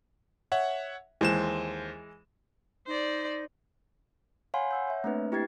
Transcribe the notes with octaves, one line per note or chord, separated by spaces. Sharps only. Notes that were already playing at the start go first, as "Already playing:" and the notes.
C#5 E5 F#5
D#2 E3 G#3 C5 E7
D#4 C5 D5
C#5 F5 F#5 G#5 B5 C6
F#5 E6 G6
C#5 E5
A3 A#3 C4 D4 B4
E4 G4 G5 G#6 A6 C7